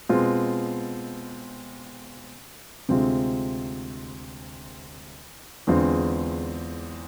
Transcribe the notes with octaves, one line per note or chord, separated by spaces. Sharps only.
B2 G#3 C4 F4
D2 C3 G#3 C4 F4
E2 D3 G#3 C4 F4